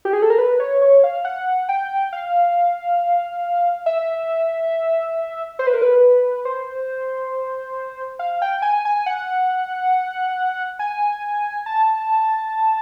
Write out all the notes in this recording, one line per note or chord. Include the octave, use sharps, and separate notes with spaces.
G4
G#4
A4
A#4
B4
C#5
C#5
F5
F#5
G5
F5
E5
C5
B4
A#4
B4
C5
F5
G5
G#5
G#5
F#5
G#5
A5